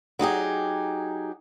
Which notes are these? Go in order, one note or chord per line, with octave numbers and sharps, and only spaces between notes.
F#3 D#4 G4 G#4